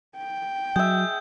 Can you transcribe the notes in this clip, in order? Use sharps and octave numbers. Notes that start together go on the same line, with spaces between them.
G5
F#3 G#4 E5 G6